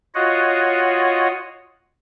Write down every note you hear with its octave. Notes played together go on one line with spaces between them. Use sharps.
F4 F#4 C#5 D#5 F#5